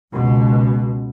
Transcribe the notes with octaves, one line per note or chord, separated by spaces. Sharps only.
C#2 B2